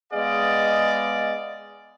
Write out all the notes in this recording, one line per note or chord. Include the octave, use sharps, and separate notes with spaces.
G#3 B3 G#4 D5 D#5 F5